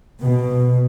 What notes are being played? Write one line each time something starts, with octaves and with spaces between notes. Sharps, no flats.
B2